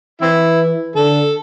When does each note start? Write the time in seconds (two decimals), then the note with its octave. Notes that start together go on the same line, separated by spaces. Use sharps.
0.22 E3 C4 E4
0.96 D3 A4